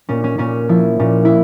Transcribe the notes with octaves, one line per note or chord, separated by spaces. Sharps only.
A#2 C#4
C#4
A#2 C#4
F3 E4
A#2 C#4
E4